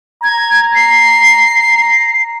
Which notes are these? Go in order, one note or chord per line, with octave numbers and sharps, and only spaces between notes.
A#5 G#6
C7